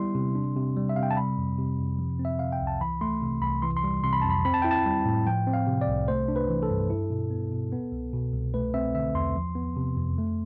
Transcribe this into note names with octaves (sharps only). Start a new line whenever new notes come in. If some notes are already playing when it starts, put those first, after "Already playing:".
Already playing: G3 B3 E4 C6
C3
D4
C3
G3
E5
C3 F5
G5
A5
G3 B5
F2
C3
F2
F3
C4
E5
C3 F5
G5
C2
A5
E3 B5
A3 C6
C3
C2 B5
E3 C6
C6
G3
C3 C6
B5
F2 A5
B5
C4 B5
A5
E4 G5
A5
G3
A2
F3 G5
C4
F5
C3
D5
C2
A3 C5
D4
B4
E3
A4
G2
E4
B2
B3
B2
B3
C2
B2
C2
A3 B4
C4 E5
D3 E5
E2 C6
F3
B3
C3
F2
A3